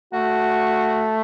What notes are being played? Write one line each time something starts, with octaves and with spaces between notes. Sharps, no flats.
A3 F#4